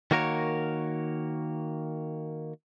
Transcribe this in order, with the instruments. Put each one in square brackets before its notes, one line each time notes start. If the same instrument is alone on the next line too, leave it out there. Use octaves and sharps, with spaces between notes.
[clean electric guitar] D#3 A#3 F#4 A#4 C#5